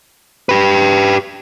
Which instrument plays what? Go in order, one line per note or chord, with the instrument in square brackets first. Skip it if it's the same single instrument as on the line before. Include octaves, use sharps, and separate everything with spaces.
[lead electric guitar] G4 B4